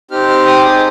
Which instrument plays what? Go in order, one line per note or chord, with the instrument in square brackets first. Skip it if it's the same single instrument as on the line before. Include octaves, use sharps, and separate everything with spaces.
[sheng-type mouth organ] C4 D#4 G4 F6
F6
D#6
D6
C4 D#4 G#4 D#6